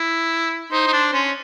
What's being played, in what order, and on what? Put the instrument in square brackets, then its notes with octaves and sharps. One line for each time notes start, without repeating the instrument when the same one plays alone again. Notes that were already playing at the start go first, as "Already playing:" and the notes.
Already playing: [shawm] E4
[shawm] D#4 [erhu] C5
[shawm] D#4
D4
C#4